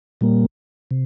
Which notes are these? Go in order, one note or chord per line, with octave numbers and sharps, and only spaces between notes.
A#2 G3 A#3
C3